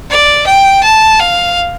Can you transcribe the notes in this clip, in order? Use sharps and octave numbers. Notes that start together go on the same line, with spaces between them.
D5
G5
A5
F5